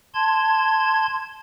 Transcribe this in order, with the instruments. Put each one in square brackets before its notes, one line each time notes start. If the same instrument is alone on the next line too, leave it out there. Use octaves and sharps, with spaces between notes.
[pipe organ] A5 C6 G#6